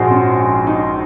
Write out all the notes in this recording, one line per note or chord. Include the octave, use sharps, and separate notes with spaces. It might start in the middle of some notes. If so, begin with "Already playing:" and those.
Already playing: A#1 G#2 F#4 G#4 C5
C#4
D#4